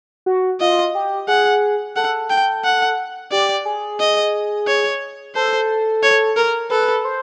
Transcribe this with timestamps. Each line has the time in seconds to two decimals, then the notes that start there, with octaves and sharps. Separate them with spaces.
0.26 F#4
0.61 F4 D#5
0.95 G4
1.28 G#4 F#5
1.96 A4 F#5
2.30 G5
2.64 F#5
3.32 G4 D5
3.65 G#4
4.00 D#5
4.67 C#5
5.35 A4 C5
6.03 C#5
6.36 A#4
6.70 A4 B4
7.05 C5